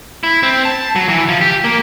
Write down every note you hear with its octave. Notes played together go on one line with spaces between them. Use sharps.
E4
C4
A5
F#3
E3
F3
G4
A#3